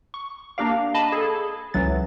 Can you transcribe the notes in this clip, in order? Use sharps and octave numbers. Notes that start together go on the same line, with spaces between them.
C#6
A#3 D4 G4 D5 F5
D#5 A5 B5
G#4 A4
C#2 E3 F#3 A6